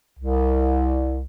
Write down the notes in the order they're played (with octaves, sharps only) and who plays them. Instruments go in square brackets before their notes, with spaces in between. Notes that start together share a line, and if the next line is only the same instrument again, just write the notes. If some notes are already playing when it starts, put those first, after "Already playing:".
[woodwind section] C2